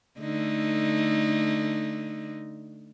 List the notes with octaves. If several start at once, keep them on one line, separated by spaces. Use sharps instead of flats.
D3 A3 D#4